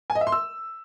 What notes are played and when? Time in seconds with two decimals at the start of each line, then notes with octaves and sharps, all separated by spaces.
0.10 G#5
0.15 D#5
0.21 E5
0.27 C6
0.32 E6